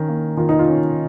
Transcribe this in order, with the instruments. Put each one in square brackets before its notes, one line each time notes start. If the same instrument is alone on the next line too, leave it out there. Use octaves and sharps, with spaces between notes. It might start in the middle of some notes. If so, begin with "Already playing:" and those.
Already playing: [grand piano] D#3 C#4
A#3
[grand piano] D#3 [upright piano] F4
[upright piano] D#4
F4
[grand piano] C#4